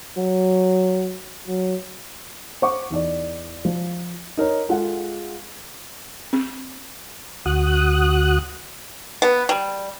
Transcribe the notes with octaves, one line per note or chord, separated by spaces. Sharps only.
F#3
F#3
C5 F#5 C#6 D6
E2 D#4 D5
F3
D#4 A#4 C#5
G#3 F4 G#4 A4 F#5
C4
D2 F#4 D#6 F#6
B3
G3